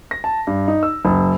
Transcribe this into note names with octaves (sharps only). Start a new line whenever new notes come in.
A#6
A5
G2
D#4
E6
F#1